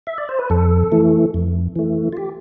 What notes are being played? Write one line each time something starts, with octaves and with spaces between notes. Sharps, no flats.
E5
D5
C5
B4
F2 A4
E3 A3
F2
E3 A3
F4
G4